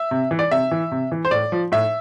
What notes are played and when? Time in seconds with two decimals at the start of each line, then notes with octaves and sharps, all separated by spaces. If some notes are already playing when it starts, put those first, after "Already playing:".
Already playing: E5
0.11 C3
0.31 E3
0.39 D5
0.51 C3 E5
0.71 E3
0.91 C3
1.12 E3
1.25 C5
1.31 A2 D5
1.52 F3
1.72 A2 E5